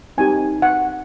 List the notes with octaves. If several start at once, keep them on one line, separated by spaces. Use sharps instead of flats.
C4 D#4 G4 G#5
F#5